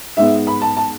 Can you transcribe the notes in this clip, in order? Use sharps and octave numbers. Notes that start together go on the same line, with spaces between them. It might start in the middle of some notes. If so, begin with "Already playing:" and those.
G#2 G#3 B3 E5
B5
A5
A5